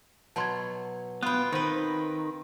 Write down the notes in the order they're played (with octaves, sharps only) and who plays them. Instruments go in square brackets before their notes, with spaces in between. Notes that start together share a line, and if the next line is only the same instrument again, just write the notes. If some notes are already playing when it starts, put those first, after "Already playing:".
[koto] B2 F#3 [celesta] A5 C6 G#6
[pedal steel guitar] B3 [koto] F4 G5 [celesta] B5 F#6
[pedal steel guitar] D#3 [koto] C4 B4